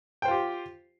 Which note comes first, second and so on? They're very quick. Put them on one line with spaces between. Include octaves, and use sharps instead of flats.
G5 C5 F4 G4